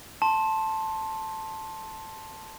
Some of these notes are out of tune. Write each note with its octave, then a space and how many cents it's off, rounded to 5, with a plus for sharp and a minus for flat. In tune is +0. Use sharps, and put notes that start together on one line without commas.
A5 +0 C6 +20